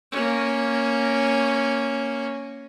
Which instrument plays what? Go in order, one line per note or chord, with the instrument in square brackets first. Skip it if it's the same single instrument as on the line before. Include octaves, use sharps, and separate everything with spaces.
[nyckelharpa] A#3 C#4